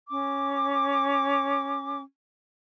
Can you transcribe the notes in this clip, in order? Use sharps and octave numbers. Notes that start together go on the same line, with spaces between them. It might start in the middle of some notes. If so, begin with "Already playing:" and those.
C#4 D6